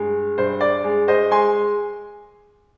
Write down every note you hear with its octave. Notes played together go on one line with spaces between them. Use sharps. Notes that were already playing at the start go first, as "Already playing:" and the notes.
Already playing: G2 G#3
G2 C5
D5
G#3
C5 D#5
G#3 G#5 C6